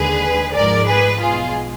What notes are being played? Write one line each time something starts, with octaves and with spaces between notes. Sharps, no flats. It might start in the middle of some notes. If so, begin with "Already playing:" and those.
Already playing: D#2 D3 G#3 G#4 B4
G#1 G#2 F3 G#3 A#4 D5
G#4 B4
B1 B2 G#3 F4 G#4